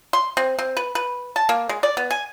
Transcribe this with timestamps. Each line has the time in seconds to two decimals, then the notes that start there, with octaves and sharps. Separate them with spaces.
0.13 C6
0.37 C4
0.59 C4
0.77 B4
0.95 B4
1.36 A5
1.49 A#3
1.69 G#3
1.83 D5
1.97 B3
2.11 G#5